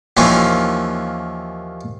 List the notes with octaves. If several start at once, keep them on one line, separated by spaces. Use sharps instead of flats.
D#2 E3 F3 A#3 C#4